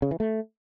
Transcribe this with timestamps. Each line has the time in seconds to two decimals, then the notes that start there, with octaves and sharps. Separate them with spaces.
0.02 C#3
0.11 E3
0.20 A3